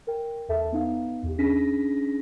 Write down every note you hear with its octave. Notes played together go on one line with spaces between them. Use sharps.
A#4 G5
E2 A4 E5 A5
B3 D#4 F5
E2 G4
C#4 D4 G#4 A#6 B6